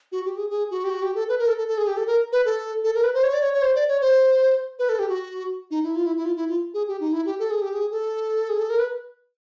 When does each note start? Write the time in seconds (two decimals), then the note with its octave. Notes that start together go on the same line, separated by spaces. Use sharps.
0.12 F#4
0.25 G4
0.37 G#4
0.50 G#4
0.71 F#4
0.84 G4
0.90 F#4
1.02 G4
1.15 A4
1.29 B4
1.39 A#4
1.48 A4
1.58 A4
1.68 A4
1.78 G#4
1.87 G4
1.97 A4
2.07 A#4
2.32 B4
2.45 A4
2.84 A4
2.95 A#4
3.03 B4
3.14 C5
3.24 C#5
3.33 D5
3.42 C#5
3.53 C#5
3.62 C5
3.75 D5
3.88 C#5
4.01 C5
4.79 B4
4.89 A4
4.99 G4
5.09 F#4
5.71 D#4
5.83 E4
5.96 F4
6.06 E4
6.17 E4
6.25 F4
6.36 E4
6.49 F4
6.74 G#4
6.88 G4
7.00 D#4
7.13 E4
7.26 G4
7.39 A4
7.51 G#4
7.62 G4
7.74 G#4
7.91 A4
8.49 G#4
8.59 A4
8.70 A#4
8.79 B4